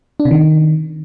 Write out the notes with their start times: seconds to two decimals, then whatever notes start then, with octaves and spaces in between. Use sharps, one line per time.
0.20 D4
0.25 C3
0.31 D#3